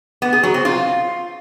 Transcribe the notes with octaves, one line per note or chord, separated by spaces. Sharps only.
B3
G#4
F#3
C4
F4